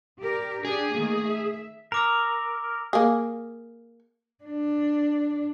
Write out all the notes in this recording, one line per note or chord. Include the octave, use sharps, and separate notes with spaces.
G4 A#4 D5
D4 G4 G#4
D#3 A3 A#3
E5
A#4 A#5 D6 E6
A#3 G#4
D4